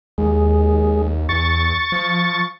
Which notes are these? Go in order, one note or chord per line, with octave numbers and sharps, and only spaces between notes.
D#2 G#3
E2 C#6 A6
F3